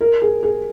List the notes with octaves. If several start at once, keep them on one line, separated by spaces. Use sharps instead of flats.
A#4
G#4
G#4